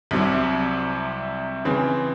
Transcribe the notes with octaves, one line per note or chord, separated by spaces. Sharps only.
C2 C3 F#3
C#3 E3 C4